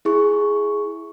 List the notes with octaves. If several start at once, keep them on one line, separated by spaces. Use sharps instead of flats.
E4 G#4 C#6